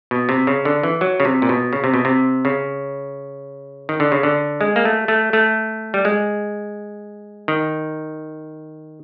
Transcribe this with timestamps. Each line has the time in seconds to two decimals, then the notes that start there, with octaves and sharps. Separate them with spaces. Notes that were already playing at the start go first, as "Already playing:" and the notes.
0.11 B2
0.29 C3
0.47 C#3
0.65 D3
0.83 E3
1.01 F#3
1.20 C#3
1.25 C3
1.42 A#2
1.49 B2
1.73 C#3
1.84 C3
1.94 B2
2.05 C3
2.45 C#3
3.89 D#3
4.00 D3
4.12 C#3
4.23 D3
4.61 G#3
4.76 A#3
4.85 A3
5.08 A3
5.33 A3
5.94 G3
6.05 G#3
7.48 D#3